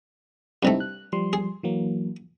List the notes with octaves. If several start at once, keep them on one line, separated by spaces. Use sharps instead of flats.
G2 C3 A3 C4 D#4 E4
F#6
F3 G3 C6
G#4
E3 F#3 A#3